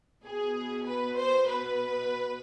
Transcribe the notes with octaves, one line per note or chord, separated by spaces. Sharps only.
B2 B3 G#4
B4
C5
B4